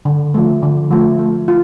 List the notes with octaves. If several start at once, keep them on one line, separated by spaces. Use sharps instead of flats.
D3
F3 A3
D3
F3 A3
A3
F4